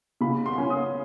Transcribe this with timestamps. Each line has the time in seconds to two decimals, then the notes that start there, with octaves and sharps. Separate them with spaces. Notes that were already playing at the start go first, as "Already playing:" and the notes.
0.21 C#3 B5
0.46 C6
0.58 C#4
0.70 D#6